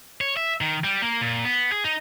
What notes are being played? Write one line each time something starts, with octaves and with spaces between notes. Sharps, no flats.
C#5
E5
D#3
G3
A#3
A#2
B3
G#4
D#4